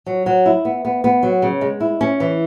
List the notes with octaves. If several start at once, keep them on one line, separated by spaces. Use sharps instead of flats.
F#3
F#3
E4
B3
B3
B3
F#3
C#3
G#3
E4
C#4
E3